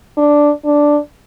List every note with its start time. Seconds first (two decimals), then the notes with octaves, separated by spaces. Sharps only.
0.17 D4
0.65 D4